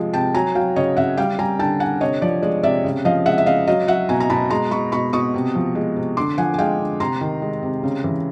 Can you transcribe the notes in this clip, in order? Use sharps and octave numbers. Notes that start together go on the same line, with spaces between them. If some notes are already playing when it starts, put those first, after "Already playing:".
Already playing: C3 F3 G#3
C3 G5 A5
F#3 G#5 A#5
F#3 F5 G5
C#3 C#5 D#5
C#3 E5 F#5
G3 F5 G5
G3 G#5 A#5
D3 G5 A5
D3 F#5 G#5
C3 C#5 D#5
F3 D5
G#3 D5
C3 D5 E5
C#3
F3 D#5 F5
G#3 E5 F#5
E5
C#3 D#5 F5
F#3 D#5 F5
F#3 E5 F#5
B2 G#5 A#5
A#5
B2 A5 B5
G#3 A#5 C6
G#3 B5 C#6
B2 B5 C#6
B2 C#6 D#6
C3
F3
G#3
C3
D3 C6 D6
F3 F#5 G#5
G#5
G#3 F5 G5
D3
C3 A#5 C6
D#3
G#3
C3
C#3
E3